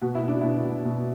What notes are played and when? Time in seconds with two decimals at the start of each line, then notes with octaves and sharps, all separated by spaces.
0.02 B2 F#4
0.15 E4
0.23 B2 D4
0.41 B2 E4
0.64 B2
0.85 B2